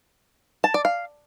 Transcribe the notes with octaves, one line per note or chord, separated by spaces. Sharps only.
A5
D5
F5